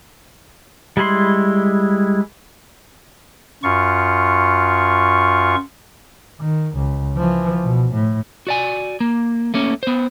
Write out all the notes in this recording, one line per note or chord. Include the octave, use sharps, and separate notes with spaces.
G3 G#3 E4 B5 C6
F#2 F4 C#6
D#3
C#2
E3 F3
B2
A2
F#4 D5 G#5
A#3
A3 A#3 C#4
B3 C5